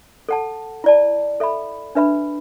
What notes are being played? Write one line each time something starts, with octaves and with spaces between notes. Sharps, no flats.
A4 F#5 A5
E4 D5 A5
A4 E5 B5
D4 B4 E5 B5